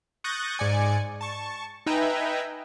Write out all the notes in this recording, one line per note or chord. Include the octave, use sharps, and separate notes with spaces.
C#6 D#6 F#6 G6 A6 A#6
G#2 D5 G#5 C#7
A5 C#6
D#4 B4 E5 G5 G#5 A#5